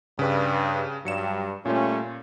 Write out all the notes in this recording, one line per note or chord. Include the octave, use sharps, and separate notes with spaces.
G2 C#3 B4
G2 F#3 C#7 E7
A#2 G3 A3 C#4 F4